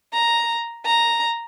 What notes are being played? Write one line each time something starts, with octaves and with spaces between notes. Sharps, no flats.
A#5
A#5